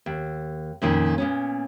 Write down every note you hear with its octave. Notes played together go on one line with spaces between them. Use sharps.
D#2
F2 A#2 D#3 C#4
A#2 B3 C#4